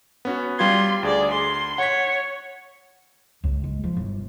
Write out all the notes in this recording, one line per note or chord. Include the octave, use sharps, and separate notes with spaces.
B3 C#4 F#4
G3 F4 C6 G#6
D2 G#4 D5
C6
C#5 F#5 B6
C#2
G#3
F3
G1